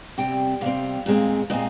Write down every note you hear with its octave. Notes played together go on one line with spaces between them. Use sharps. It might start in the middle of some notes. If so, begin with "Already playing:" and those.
C3 G3 C4 G5
C3 G3 C4 F5
A#2 G#3 C4
A#2 G#3 C4 D#5